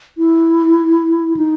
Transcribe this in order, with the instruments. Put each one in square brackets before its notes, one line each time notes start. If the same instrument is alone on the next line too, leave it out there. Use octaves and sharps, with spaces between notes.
[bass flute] E4
D#4